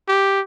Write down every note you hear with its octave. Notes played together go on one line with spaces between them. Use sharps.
G4